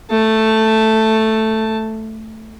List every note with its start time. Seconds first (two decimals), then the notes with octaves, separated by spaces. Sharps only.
0.10 A3 A5